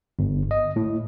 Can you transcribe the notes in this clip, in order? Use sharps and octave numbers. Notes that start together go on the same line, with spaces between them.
G1
D#5
A2